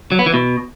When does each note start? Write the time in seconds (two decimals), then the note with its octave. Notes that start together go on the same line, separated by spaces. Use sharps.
0.12 F#3
0.19 B3
0.26 E3
0.34 B2